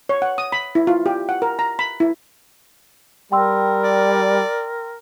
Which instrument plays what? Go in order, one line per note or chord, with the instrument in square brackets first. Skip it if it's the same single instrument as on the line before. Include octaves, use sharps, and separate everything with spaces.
[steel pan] C#5
F#5
D#6
B5
E4
F4
G4
F#5
A#4
A#5
B5
E4
[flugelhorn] G3 [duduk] A#4 [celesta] G5 C6 E6
[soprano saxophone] D5